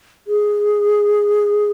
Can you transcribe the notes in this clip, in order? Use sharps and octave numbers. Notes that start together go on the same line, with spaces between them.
G#4